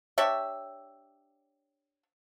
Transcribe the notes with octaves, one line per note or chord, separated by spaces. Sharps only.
D4 G4 C#5 E5